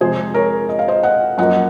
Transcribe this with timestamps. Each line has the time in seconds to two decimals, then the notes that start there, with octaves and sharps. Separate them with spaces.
0.01 F2 C3 F3 G#3 G#4 C5
0.34 A#4 C#5
0.69 D#5
0.79 F5
0.88 C5 D#5
1.03 D#5 F#5
1.38 F#2 F3 A#3 D#5 F#5